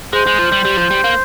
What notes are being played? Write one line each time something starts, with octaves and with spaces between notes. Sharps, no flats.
G#3 C5
G#3
F3
G3
G3
F3
G3
A#3